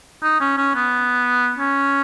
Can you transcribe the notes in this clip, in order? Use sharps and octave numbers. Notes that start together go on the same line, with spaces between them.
D#4
C#4
C#4
B3
C#4